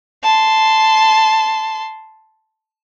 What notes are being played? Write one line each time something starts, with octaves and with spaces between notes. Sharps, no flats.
A5 C6